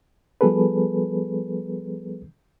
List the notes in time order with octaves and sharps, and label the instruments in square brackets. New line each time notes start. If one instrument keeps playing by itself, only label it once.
[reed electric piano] F3 G3 B3 G#4 A4 B4